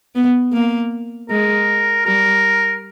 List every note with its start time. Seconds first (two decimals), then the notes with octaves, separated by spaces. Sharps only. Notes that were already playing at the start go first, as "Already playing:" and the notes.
0.15 B3
0.53 A#3
1.30 G#3 A#4
2.06 G3 A#4